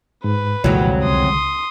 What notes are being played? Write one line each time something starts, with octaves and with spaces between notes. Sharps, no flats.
G#2 B4
C2 F2 A#2 D3 E3 F#3 G#3
C#2 C6 D#6